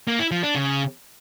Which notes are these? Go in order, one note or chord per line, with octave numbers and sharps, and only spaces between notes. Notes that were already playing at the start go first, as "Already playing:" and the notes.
A#3
E4
F3
D4
C#3